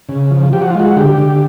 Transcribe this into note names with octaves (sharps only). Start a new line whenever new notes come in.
C#3
F3
F3 G4
F#4
F4
G#3 F#4
D3 G4
D3